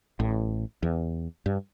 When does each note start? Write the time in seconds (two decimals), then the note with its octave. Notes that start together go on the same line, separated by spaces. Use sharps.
0.20 A1 A2
0.83 E2
1.46 G2